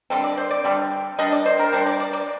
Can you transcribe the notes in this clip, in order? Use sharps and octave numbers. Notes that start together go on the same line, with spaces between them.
D3 G3 C4 A4
D5
C5
D5
D3 G3 C4
G3 D4 D#5
D5
C5
A#4
G3 D4 C5
D5
D5
D5